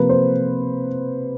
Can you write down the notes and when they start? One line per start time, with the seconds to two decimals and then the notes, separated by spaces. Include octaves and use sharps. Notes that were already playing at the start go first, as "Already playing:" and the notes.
Already playing: C3 F3 A#3 B4
0.09 C5